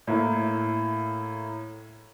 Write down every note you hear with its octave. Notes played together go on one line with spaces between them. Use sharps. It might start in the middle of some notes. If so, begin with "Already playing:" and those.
A2 A#3 E4